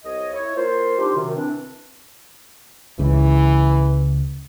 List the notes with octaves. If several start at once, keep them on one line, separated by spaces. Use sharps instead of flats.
C2 C#5 D#5
E4 C#5
A#3 F4 C5
G3 C4 D4 D#4 F4 G4
F#2 C3 D#3
E3 C4 D4
C#2 C#3 E3